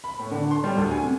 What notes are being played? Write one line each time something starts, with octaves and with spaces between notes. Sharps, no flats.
B5
A2
D3
C6
G3
D2
G#5
C3